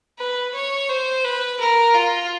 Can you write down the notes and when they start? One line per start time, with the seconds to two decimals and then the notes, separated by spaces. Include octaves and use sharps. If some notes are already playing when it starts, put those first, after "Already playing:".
0.18 B4
0.54 C#5
0.89 C5
1.24 B4
1.60 A#4
1.95 F4